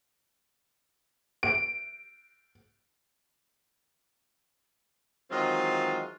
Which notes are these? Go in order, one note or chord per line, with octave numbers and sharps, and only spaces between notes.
D7
D#3 E3 F#3 G#3 C4 F4